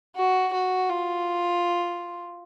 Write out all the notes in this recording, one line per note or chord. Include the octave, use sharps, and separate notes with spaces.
F#4
F#4
F4